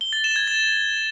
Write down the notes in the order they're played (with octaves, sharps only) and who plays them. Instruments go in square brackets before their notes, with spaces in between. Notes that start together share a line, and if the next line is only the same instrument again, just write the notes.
[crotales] G7
A6
E7
G#6
A6